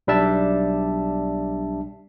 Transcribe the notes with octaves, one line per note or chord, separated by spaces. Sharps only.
B1 G3 D4 E5 A5